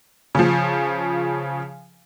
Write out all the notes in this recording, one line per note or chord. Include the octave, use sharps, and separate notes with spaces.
C#3 F3